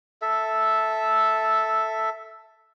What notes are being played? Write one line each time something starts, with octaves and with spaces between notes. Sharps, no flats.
A4 E5